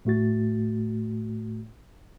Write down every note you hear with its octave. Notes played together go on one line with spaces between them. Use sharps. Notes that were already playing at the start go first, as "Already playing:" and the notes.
A2 A3 F#4 A6